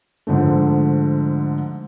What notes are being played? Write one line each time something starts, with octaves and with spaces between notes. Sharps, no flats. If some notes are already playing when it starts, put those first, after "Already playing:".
G#2 D3 F3 A3